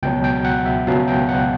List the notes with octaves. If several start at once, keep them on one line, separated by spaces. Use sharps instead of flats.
C#2 B2 F#3 G5
G5
F#5
E5
C#2 B2 F#3 F5
G5
F#5